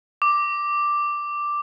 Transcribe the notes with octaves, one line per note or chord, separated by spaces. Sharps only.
D6